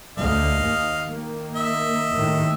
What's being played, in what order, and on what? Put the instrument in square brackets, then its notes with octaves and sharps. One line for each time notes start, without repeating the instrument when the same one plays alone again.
[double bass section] D2 [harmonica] D#5 F5
[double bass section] D#2
D#3 A#3
[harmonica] D#5 E5
[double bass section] D#2 A2 D#3